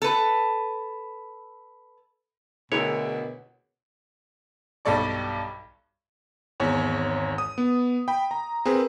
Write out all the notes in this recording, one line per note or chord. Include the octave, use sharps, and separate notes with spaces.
A4 B4
D2 B2 D3 E4 G#4 A#4 C#5
B1 G2 G3 A4 D5 C#6
G#1 E2 C#5
D#6
B3
G5 B5
A#5
C4 G#4 A#4 B4